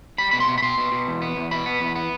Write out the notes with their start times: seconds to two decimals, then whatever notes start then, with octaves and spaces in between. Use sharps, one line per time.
0.18 G3 B5
0.31 B2 B5
0.40 C6
0.48 B2
0.58 B5
0.62 B2 C6
0.78 B2
0.92 B2
1.07 E2
1.22 B3
1.36 E2
1.51 B2 B5
1.66 B3
1.81 E2
1.96 B3